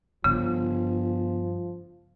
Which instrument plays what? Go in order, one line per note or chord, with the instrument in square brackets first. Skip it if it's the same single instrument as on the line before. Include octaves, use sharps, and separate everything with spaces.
[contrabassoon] G1 [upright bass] G2 [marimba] C#3 [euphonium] F3